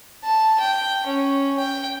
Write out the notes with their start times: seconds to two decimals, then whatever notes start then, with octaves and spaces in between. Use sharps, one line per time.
0.24 A5
0.60 G5
1.06 C#4
1.59 G5